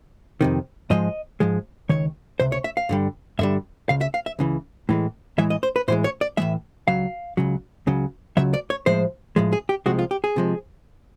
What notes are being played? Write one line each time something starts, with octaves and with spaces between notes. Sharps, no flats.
F2 C3 D#3
G#2 F3 G#3 D#5
G#2 F3 G#3
C#2 C3 D#3 C#5
C#2 C3 C5
C#5
E5
F5
G2 D3 G3
G2 D3 G3 E5
C#2 C#3 F5
E5
F5
E5
C#2 C#3 E3
A2 E3 G#3
A2 E3 G#3 E5
D#5
C5
B4
A2 E3 G#3 C5
C#5
D5
A2 E3 G#3 E5
C#2 C#3 F#3 F5
C#2 C#3 F#3
C#2 C#3 F#3
C#2 C#3 F#3 E5
D5
C#5
A2 F3 G#3 C5
A2 F3 G#3
G#4
G4
C2 C3 F3 G#3 F#4
F4
G4
G#4
C3 F3 G#3